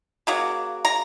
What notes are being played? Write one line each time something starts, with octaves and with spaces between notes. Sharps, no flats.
C#3 F#3 A#3
A#5